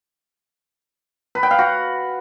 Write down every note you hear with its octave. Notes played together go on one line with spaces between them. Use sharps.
B4
G5
F5
F#4